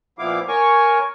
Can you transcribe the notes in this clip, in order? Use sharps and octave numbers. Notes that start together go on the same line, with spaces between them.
A#2 F3 B3 E4 F5 D6
A#4 C#5 G#5 C#6